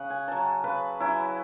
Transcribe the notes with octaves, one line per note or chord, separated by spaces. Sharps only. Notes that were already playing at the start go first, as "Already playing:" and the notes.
Already playing: C#3 F#5
G#5
F#3 C#4 A5
C#3 B4
F#3 C#4 E4